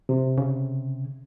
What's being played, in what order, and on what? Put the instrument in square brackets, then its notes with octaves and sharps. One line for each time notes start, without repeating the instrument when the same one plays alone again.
[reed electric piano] C3
[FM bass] C#3